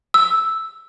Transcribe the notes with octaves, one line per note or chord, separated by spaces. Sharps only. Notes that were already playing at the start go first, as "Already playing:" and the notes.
E6